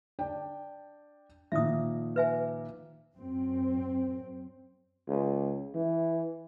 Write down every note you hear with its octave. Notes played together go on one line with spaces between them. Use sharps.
D4 D5 G5
A#2 D#3 F3 E5 D#6
B4 E5 G#5
F#2 C4
C#2
E3